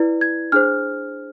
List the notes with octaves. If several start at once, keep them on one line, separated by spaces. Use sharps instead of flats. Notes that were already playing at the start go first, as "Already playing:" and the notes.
Already playing: E4 B4 D5
G#6
D4 G#4 C5 F6